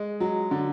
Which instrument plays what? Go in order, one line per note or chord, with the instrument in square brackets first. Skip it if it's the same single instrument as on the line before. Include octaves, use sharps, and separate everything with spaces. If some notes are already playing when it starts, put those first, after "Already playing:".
Already playing: [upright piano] G#3
F#3
D3